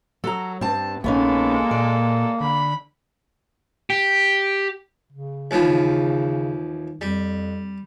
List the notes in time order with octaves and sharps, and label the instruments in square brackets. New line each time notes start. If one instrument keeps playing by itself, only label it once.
[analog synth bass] F#3 [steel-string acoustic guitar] A4 A#5
[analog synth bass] G2 [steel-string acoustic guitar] C4 A5
[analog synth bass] A#1 [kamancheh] G#3 A4 [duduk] A#3 [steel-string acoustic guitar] B3 C#4 D#4
[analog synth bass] A#2 [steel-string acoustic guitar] D5
[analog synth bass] D3 [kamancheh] B5
[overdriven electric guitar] G4
[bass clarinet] C#3
[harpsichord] D#2 E3 F3
[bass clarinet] C#3
[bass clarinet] F2 [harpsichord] G3